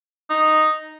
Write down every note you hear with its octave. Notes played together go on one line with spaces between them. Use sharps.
D#4